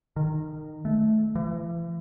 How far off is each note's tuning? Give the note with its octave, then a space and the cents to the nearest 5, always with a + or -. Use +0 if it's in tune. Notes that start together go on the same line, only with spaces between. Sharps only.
D#3 -20
A3 -20
E3 +40